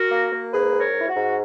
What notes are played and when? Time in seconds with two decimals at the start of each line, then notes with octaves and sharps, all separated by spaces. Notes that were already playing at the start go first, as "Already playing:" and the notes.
Already playing: F#4 A#4
0.11 A#3
0.31 A#3
0.52 G#2 G#4 B4
0.73 G#2
0.80 A#4 C#5
0.94 G#2
1.01 E4
1.09 F#4
1.15 G#2